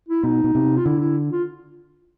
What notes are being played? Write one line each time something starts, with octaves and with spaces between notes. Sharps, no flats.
E4
B2 D#4
B2
C3
F4
D3 E4
E4
F4